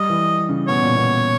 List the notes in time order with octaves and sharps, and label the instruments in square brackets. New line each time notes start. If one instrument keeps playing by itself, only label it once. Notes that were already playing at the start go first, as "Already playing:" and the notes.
Already playing: [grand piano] G3 [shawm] D#5
[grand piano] E3
C#3
[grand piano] B2 [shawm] C#5
[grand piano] A#2
B2